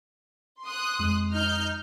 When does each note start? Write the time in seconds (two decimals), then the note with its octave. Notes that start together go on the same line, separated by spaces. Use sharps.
0.64 C6 D#6 F#6
0.99 F2 G#3
1.32 D#4 F6 G6